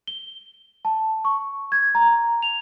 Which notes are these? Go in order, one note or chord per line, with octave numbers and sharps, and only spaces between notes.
G7
A5
C#6
G#6
A#5
F7